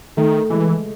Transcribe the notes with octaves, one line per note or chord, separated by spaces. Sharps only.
D#3 A3
E3 G#3